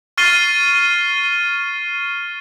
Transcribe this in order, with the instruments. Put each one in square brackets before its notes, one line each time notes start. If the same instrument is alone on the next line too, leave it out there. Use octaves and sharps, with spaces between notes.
[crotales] C#6 F6 A6 C7 D#7 G7